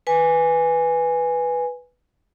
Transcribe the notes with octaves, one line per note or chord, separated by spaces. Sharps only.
B4 G#5